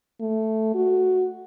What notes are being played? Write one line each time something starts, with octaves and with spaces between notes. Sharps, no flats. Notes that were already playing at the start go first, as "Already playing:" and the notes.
A3
F#4